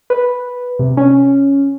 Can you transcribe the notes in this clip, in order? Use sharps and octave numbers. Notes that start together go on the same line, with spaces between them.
B4
C3
C#4